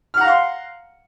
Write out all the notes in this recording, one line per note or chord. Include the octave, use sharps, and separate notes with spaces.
F5 F#5 A#5 C6 F6